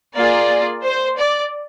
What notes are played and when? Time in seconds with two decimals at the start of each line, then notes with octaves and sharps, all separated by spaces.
0.15 A#3 F4 G#4 D5
0.83 C5
1.17 D5